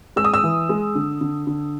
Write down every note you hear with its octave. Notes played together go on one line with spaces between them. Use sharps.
G#3 E6
D#6
E6
E3
G#3
D3
D3
D3